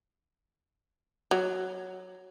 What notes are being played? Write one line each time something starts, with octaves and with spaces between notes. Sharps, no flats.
F#3